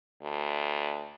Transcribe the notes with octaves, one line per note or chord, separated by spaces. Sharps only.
D2